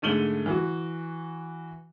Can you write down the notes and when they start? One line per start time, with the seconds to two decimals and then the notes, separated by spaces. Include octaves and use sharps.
0.02 G#2 D3 A3 D#7 F#7 G7
0.46 E3 F#4